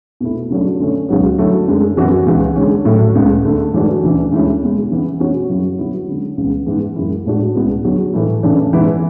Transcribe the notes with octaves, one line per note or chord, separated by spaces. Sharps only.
B2 A3 E4
C#3 F#3 A3 D4
D3 A3 C#4
C#2 C#3 F#3 B3
D3 F#3 A3 E4
F#2 D3 G#3
F#2 E3 B3 F#4
C#2 C#3 E3 B3
D3 G#3 C#4
A2 F#3 A3
C#2 C#3 G#3 B3
D2 D3 A3
G#2 E3 A3 D4 F#4
D2 C#3 E3
D2 C#3 G#3 C#4 E4
E2 B2 G#3
C#3 E3 B3 E4
B2 A3 C#4 F#4
F#2 C#3 F#3 C#4 E4
D3 F#3 B3 E4
D3 G#3 C#4
C#2 C#3 E3 B3
G#2 E3 B3
F#2 C#3 G#3 C#4 E4
A2 G#3 D4 F#4
C#2 B2 G#3 B3 E4
E2 D3 F#3
A2 E3 A3 E4
C#3 E3 A3 D4
G#2 E3 B3 E4